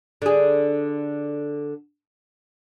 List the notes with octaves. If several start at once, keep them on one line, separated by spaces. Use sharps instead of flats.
D3 G#4